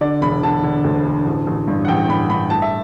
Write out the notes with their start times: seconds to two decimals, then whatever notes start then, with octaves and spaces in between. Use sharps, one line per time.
0.01 D3 D5
0.22 E1 B5
0.43 D3 A5
0.63 D3
0.84 D2
1.05 D3
1.25 A1
1.47 A1
1.67 G2
1.85 F#5
1.88 A1 G5
2.09 G2 B5
2.30 G2 B5
2.50 A2 A5
2.62 E5